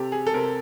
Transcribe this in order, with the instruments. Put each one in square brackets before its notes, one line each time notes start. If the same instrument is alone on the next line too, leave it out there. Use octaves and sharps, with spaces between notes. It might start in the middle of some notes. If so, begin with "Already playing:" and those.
Already playing: [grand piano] C3 G4 A4
G#4
A4
C3 A#4